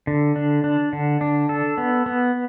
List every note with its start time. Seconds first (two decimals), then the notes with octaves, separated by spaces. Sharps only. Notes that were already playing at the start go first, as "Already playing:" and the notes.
0.07 D3
0.36 D4
0.64 D4
0.93 D3
1.21 D4
1.49 A4
1.78 B3
2.06 B3